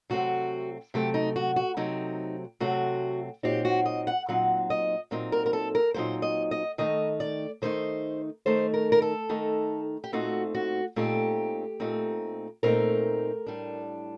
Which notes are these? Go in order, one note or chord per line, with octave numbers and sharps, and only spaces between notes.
C3 F#3 A3 C4 F#4
C3 F#3 A3 C4 G4
D#4
F#4
F#4
C3 F#3 A3 C4 D#4
C3 F#3 A3 C4 F#4
A#2 F#3 C4 D#4 G4
F#4
D#5
F#5
A#2 F#3 C4 D#4 F#5
D#5
A#2 F#3 C4 D#4
A#4
A#4
A4
A#4
A#2 F#3 C4 D#4 C5
D#5
D#5
D#3 A3 D#4 D#5
D5
D#3 A3 D#4 C5
D#3 A3 D#4 C5
A#4
A#4
A4
D#3 A3 D#4
G4
A#2 A3 C4 D#4 F#4
F#4
A#2 A3 C4 D#4 G4
A#2 A3 C4 D#4
A#2 A3 C4 D#4 A#4
A2 G3 D4